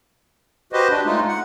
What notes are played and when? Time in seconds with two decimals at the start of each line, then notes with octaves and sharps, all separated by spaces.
0.73 F#4 G4 B4 C5 D#5
0.91 D4
1.05 G#3 A3 D#4 F4
1.28 F#5